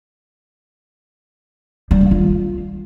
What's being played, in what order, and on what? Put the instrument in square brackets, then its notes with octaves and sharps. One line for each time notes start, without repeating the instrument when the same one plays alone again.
[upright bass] G3
D#3
F4